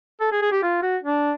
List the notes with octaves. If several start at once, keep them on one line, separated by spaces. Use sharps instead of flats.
A4
G#4
G#4
G4
F4
F#4
D4